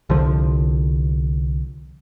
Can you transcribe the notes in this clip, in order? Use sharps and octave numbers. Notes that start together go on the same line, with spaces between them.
C2 D3 F3